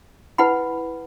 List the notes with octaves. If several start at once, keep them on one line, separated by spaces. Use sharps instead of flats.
E4 B4 F#5 B5